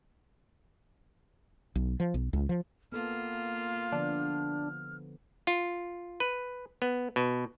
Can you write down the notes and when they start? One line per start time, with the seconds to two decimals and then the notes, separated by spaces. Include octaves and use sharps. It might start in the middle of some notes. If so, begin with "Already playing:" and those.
1.75 B1
2.00 F3
2.14 B1
2.33 C#2
2.49 F3
2.92 A#3 B3 F4 A4 F6
3.92 D3 F3 B3 D4
5.47 F4
6.20 B4
6.82 B3
7.16 B2